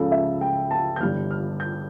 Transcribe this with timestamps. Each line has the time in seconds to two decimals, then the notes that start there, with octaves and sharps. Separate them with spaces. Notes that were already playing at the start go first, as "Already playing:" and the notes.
Already playing: C#2 C#3 F3 A4
0.12 E5
0.41 G5
0.71 A5
0.96 G6
1.00 G1 G2 E3 G3 F6
1.31 F6
1.60 G6